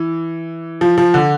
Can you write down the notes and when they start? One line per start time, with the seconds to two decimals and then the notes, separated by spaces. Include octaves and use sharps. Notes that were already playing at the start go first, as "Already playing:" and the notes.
Already playing: E3
0.81 F3
0.98 F3
1.14 D3